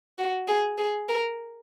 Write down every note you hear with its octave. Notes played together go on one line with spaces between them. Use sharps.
F#4
G#4
G#4
A#4